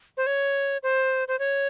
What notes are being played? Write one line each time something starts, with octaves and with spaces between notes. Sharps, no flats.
C5
C#5
C5
C5
C#5